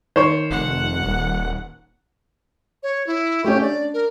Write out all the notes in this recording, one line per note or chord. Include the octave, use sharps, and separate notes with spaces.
D#3 C5 C#5
F1 F#5
D#1
C#5
E4
A3 C#4 G4
D4 D5
A#4